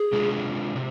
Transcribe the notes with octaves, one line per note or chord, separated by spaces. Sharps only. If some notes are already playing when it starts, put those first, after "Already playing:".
Already playing: G#4
C3 G#3 D4 F4
C3